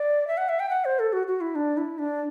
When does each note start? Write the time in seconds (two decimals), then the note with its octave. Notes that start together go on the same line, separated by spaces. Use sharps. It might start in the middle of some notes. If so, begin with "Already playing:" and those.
Already playing: D5
0.28 E5
0.37 F#5
0.49 E5
0.60 G5
0.70 F#5
0.85 C5
0.99 A4
1.13 F#4
1.27 F#4
1.41 E4
1.55 D4
1.77 E4
1.99 D4